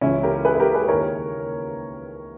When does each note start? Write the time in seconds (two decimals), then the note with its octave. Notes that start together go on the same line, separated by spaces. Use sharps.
0.01 C#2 C#3 E3 C#4 E4
0.23 G4 A#4
0.45 G#4 B4
0.55 B4
0.60 G4 A#4
0.74 G#4 B4
0.88 D#2 D#3 A#4 C#5